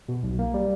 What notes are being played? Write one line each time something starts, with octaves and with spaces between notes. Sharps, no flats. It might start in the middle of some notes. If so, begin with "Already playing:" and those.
B2
B1
A#3
G3